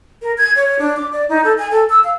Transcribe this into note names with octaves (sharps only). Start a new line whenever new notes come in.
A#4
G#6
C#5
D4
D6
D5
D#4
A4
G#5
A4
E6
F5